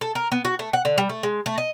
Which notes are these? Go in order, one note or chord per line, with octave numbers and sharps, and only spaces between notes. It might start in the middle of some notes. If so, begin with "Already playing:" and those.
A4
A#4
B3
F#4
A3
F#5
D3
G3
A3
G#3
A3
D#5